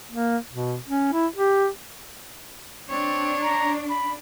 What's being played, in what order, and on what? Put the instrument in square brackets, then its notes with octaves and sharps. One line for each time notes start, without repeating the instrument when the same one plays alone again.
[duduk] A#3
B2
C#4
E4
G4
[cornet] C4 [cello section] D4 [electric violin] C#5
[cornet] A#5
B5